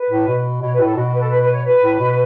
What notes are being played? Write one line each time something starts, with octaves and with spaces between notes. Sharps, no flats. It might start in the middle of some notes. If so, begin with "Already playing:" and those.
Already playing: B4
A2
B2
B2 C#5
B4
A2
A4
B2 F#4
F#4
B4
A4
B4
B4
C#5
B4
A2
B2